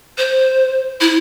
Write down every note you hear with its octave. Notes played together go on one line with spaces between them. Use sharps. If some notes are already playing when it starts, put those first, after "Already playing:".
C5
E4